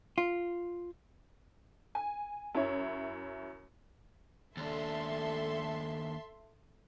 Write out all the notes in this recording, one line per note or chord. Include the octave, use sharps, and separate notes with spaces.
F4
G#5
F#2 E4 C#5
D#2 D4 A4 E5 C6